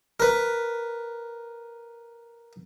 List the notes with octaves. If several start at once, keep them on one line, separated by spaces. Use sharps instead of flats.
A#4 B4